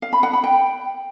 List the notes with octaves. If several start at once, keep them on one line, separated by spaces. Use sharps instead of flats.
F5
B5
F#5
B5
G5